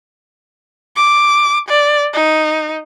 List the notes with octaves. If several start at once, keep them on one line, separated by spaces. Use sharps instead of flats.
D6
D5
D#4